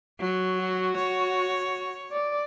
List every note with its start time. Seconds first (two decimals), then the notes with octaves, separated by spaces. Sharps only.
0.20 F#3
0.61 F#4
0.97 C#5
2.12 D5